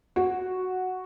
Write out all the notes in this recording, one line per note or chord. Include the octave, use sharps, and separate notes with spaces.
F#4